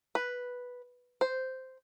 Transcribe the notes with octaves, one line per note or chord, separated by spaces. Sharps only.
B4
C5